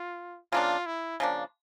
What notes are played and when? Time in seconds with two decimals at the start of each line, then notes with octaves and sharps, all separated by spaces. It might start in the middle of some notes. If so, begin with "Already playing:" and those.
Already playing: F4
0.52 C#3 F3 A#3 D4 F4
0.86 E4
1.20 C#3 F3 A#3 D4